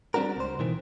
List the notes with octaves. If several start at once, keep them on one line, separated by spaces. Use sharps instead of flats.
G3 C4 D4 F#4 A#4
C#2 C5
B2 D#3 E3